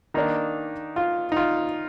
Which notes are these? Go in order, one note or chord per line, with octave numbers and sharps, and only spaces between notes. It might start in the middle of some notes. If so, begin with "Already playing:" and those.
D#3 A#3 D4 D#4
F4
D#4
F4